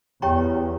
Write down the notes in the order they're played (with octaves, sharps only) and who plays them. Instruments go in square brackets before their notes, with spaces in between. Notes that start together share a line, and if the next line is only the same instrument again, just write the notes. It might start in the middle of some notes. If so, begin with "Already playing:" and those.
[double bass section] E2 [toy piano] G4 C#5 G5 A#5 C#6